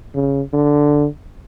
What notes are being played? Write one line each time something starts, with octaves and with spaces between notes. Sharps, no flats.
C#3
D3